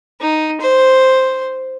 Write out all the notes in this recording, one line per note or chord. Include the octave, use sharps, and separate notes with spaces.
D#4
C5